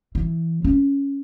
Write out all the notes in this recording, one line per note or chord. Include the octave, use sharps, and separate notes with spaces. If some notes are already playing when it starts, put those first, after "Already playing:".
E3
C#4